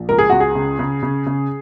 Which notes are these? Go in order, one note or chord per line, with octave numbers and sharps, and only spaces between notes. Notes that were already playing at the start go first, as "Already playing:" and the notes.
Already playing: A#1
C#2 A#4
G#4
C#2 F#4
G#4
C#3
C#3
C#3
C#3